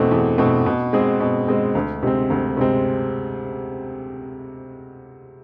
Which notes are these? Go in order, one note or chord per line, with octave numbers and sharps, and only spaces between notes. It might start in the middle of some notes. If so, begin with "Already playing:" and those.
Already playing: E2 B2 A3 C4
E2
B2 A3 C4
B2
G#3 C4 G#4
B2
G#3 C4 G#4
D2
C3 G#3 C4
D2
C3 G#3 C4